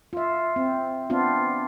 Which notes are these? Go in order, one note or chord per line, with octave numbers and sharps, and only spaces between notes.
F4 E5
C4
B3 C4 D4 F4